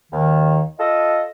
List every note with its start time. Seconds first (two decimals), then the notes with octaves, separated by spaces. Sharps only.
0.12 D#2 D#3
0.80 F4 A4 D#5